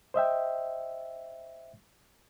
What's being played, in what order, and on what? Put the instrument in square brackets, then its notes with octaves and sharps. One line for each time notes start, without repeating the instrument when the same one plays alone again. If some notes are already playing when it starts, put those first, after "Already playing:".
[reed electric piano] C5 D#5 E5 G5